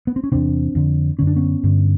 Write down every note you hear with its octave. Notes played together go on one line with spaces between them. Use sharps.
B3
C4
C#4
E2 C3 C4 D4
F2 D3
F#2 D3 C#4
D4
B3 C#4
G2 D3